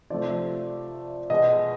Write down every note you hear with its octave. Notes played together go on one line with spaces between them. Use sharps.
C3 F3 A3 D5
B2 G#3 D#5